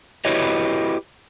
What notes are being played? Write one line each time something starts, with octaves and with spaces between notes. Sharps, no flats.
E4 F#4 G4 B4 C#5 D#5